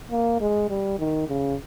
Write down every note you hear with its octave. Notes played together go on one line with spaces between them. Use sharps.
A#3
G#3
G3
D#3
C#3